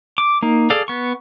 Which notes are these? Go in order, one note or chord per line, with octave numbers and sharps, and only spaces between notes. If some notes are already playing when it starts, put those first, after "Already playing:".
D6
A#3 D#4
G#4 A4 D5 F5
B3 C#6